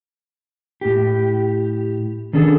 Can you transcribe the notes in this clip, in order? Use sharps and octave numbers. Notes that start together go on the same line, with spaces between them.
A2 G4
D#3 C#4 D4 G#4 A4